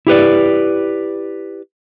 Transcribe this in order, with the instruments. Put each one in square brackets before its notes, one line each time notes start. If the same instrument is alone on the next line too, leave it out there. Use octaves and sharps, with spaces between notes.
[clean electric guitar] E4 G4 B4 D5